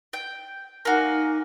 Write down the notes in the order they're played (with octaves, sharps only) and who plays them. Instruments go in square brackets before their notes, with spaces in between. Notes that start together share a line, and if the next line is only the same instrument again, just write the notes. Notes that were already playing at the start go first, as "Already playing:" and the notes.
[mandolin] G5
[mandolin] A#3 F#4 [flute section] D#4 G#5